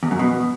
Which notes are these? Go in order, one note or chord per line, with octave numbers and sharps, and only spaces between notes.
E2
F#2
B2